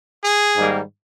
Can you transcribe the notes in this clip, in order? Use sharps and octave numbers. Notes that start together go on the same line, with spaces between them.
G#4
G#2 D#3 G3 A#3